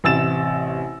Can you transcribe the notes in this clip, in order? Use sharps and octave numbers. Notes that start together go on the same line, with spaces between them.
A1 C3 E6 A6 E7